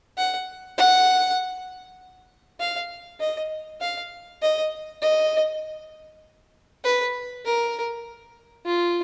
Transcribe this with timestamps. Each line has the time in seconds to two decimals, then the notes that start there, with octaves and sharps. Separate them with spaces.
0.17 F#5
0.78 F#5
2.60 F5
3.20 D#5
3.81 F5
4.42 D#5
5.02 D#5
6.85 B4
7.45 A#4
8.66 F4